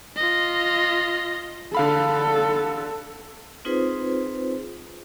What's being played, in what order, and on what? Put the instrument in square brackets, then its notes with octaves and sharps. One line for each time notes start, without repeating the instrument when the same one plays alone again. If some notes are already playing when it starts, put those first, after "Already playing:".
[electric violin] F4 D#5
[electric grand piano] D3 F5 B5 [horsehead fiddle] A4
[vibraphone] C4 D#4 F4 G#4 B4 C5